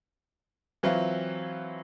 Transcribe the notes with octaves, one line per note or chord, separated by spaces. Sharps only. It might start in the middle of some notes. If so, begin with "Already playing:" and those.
E3 F#3 C4 E4 F4